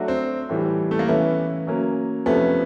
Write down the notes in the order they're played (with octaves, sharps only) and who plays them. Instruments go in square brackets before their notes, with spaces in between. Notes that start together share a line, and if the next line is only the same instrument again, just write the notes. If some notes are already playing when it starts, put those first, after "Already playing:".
Already playing: [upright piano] F#3 A3 D4 F#4
[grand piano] C4
[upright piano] A2 E3 G3
[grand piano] A3
A#3
[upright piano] E3 A3 C#4 E4 [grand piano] B3
[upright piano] F#3 A#3 C#4
[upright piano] F2 C3 F3 A3 C#4 [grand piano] B3